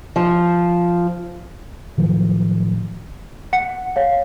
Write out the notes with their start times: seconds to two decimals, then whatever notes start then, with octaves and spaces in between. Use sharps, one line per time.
0.16 F3
1.98 A2 D#3 F3 F#3
3.53 F#5 C#7
3.96 C#5 F5